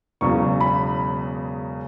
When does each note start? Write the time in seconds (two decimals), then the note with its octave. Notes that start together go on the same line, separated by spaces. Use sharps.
0.21 E1 E2 C#3 F#3 C#6
0.61 B5